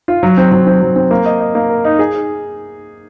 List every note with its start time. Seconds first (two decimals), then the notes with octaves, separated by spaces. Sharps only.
0.08 F4
0.23 F#3
0.37 C4
0.52 F#3
0.67 C4
0.82 F#3
0.96 C4
1.11 A#3
1.26 D#5
1.40 D#5
1.55 A#3
1.69 A#4
1.84 D#4
1.99 G#4